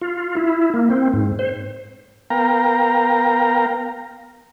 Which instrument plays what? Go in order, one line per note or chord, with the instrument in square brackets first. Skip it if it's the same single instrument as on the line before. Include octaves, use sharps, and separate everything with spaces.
[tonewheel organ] F4
E4
A#3
C4
G#2
C5
[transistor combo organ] B3 A#4 F5 G5 A#5